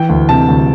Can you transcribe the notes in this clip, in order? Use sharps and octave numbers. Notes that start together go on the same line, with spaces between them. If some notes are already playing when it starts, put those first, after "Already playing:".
Already playing: E3 G5
D2
C3 A5
D2